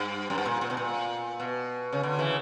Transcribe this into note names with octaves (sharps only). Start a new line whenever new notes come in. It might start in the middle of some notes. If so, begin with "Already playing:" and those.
Already playing: G2
F#2
G2
A#2
A#2
B2
A#2
B2
C#3
D3
C#3 E3